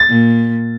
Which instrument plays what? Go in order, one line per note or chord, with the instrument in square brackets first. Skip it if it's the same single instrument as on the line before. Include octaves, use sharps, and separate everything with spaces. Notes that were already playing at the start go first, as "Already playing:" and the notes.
Already playing: [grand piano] A6
[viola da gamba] A#2